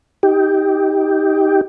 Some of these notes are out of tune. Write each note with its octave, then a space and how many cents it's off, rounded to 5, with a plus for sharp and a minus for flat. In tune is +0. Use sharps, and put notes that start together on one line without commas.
D#4 +20 G4 +0